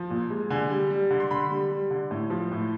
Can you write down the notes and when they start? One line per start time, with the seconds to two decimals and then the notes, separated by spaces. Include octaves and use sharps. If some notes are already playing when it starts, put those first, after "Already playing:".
Already playing: F3
0.10 A#2
0.30 G#3
0.50 D3 G#5
0.70 G3
0.90 G3
1.10 D3
1.20 C6
1.31 D3 B5
1.51 G3
1.70 G3
1.91 D3
2.11 A2
2.30 F3
2.51 A2